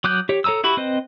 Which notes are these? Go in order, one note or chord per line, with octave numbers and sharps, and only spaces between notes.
F#3 D6 D#6 F#6 G6
G4 C#5
A4 C#5 A#5 D#6 E6
E4 F#4 G4 B5
C4 B4 C5 D#5